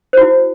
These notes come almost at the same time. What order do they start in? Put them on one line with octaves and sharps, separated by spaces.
C5 F#4 E4